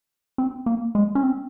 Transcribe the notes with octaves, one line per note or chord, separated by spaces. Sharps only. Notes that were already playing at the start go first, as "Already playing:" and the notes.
C4
A#3
G#3
C#4
C4